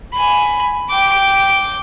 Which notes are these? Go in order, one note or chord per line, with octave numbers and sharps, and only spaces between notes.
G#5 B5
G5 D6